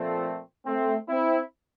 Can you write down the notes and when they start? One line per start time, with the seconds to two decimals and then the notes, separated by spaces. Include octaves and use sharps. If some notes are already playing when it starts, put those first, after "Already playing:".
Already playing: A#2 F3 A3 C4
0.65 A3 C4
1.08 C4 E4